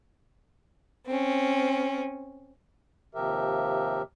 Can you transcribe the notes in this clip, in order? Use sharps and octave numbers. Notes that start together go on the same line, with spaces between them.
C4 C#4
D#2 C3 F3 G4 A#4 E5